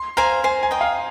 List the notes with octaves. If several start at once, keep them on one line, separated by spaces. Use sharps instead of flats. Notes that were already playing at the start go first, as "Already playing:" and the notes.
Already playing: C6
C5 F5 G#5 A#5
C5 G#5
G#5
D#5 G5
F5